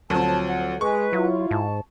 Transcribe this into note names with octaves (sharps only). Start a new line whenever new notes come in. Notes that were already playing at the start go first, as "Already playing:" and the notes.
D2 F3 F#3 C4 A5
F#5
G#3 B4 C#6
F#3 E4 F4
G#2 A5